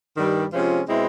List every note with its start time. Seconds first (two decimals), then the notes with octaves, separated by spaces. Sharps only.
0.16 G2 D#3 G3
0.52 C3 F3 G#3 C#4 F4
0.89 B2 G#3 C4 E4